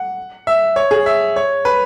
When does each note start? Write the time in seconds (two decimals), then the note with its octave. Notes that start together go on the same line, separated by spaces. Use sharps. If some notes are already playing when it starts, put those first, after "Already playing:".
Already playing: F#5
0.47 E5
0.76 C#5
0.91 G#4
1.06 E5
1.36 C#5
1.65 B4